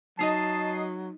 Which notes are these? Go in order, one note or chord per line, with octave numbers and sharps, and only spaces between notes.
F#3 D#4 D#5 E5 A5 D#6 C7